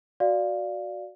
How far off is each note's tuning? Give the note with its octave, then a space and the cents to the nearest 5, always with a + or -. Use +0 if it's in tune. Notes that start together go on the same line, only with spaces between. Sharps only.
F#4 +0 D5 +0 F5 +0